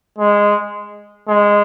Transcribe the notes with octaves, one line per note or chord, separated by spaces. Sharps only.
G#3
G#3